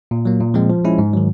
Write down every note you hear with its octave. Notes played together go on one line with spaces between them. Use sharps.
A#2
F#3 A#3
A#2
F3 G#3 C4
F3
G#3 C#4 E4
G#2
D#3 F#3